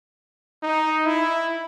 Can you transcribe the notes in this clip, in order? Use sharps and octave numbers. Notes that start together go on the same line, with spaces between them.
D#4
E4